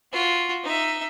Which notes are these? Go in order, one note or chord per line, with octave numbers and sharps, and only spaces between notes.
F4 F#4
D#4 E5